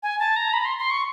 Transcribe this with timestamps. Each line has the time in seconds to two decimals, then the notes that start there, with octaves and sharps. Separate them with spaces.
0.03 G#5
0.20 A5
0.36 A#5
0.53 B5
0.65 C6
0.78 C6
0.91 C#6